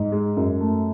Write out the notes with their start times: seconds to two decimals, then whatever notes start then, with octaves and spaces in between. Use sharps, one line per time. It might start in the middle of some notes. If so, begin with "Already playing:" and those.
Already playing: G#2
0.12 G#3
0.37 F#2
0.61 A3